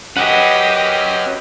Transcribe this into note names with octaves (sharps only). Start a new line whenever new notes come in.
C#4 F#4 G4 B4 D#5 F#5